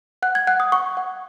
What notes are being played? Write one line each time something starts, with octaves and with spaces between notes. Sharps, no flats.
F#5 F#6
G#6
F#5 F#6
D#6
F#5 C#6
F#5